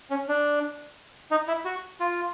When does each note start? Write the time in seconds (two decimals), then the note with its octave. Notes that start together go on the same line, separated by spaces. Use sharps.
0.10 C#4
0.28 D4
1.31 D#4
1.48 E4
1.65 F#4
2.00 F4